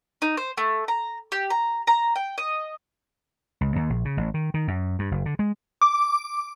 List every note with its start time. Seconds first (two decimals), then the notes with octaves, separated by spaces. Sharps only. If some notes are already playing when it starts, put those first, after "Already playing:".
0.22 D#4
0.37 C5
0.57 A3
0.88 A#5
1.32 G4
1.50 A#5
1.87 A#5
2.16 G5
2.38 D#5
3.61 C#2
3.76 D#2
3.90 A#1
4.05 C#3
4.17 A1
4.34 D#3
4.54 D#3
4.68 F#2
4.99 G2
5.11 F#1
5.26 D3
5.39 G#3
5.82 D6